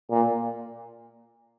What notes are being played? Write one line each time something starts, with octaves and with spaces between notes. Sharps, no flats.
A#2